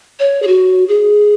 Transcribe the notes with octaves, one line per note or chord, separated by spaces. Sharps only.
C#5
G#4
F#4
G#4